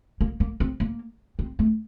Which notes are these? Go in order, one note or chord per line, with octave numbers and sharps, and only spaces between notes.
A#3
A#3
C4
A#3
C4
A3